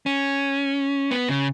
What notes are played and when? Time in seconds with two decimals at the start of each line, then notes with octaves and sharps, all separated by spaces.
0.06 C#4
1.11 B3
1.29 C#3